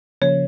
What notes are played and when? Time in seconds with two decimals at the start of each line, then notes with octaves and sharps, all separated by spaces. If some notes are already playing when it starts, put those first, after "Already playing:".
0.21 C#3 F3 A#3 C#5